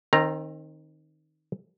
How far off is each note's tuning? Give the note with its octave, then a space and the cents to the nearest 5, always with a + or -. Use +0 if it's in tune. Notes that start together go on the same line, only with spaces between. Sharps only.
D#3 +0 C4 +30 A#5 +0